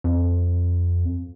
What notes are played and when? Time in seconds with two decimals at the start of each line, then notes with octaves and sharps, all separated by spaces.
0.04 F2